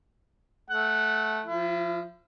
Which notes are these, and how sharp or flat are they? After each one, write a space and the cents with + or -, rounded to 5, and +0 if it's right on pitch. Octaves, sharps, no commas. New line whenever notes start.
A3 -15 F#5 +0
F3 +0 E4 +40